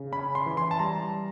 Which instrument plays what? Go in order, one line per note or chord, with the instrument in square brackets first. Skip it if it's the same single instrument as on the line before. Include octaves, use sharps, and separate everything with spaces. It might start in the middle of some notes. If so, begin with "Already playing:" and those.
Already playing: [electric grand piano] C#3
C#4 B5
C6
E3
C6
A5
G3 A#5